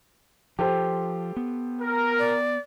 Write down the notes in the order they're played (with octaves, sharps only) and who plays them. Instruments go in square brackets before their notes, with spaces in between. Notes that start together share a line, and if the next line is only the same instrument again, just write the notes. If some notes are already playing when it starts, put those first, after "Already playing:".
[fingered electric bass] F3 [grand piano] G4 A4 C5
[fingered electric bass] B3
[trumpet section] A#4
[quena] D5